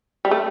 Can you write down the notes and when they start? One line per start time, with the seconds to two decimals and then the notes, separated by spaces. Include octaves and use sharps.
0.25 G3
0.31 A3